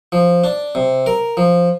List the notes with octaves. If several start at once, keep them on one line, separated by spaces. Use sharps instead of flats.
F3
D4
C3
A#4
F3